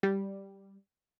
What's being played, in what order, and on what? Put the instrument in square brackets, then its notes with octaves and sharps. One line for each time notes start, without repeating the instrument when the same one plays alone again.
[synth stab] G3